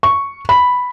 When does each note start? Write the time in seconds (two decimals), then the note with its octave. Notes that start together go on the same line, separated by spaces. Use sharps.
0.03 C#6
0.49 B5